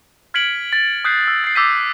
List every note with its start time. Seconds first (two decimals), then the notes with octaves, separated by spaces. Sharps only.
0.34 F6 G#6 B6 C#7 D7 F#7
0.73 A6
1.05 D#6 F#6 G6 B6 C7
1.28 E6
1.44 A6 C7
1.55 D6 E6 G6 B6 D#7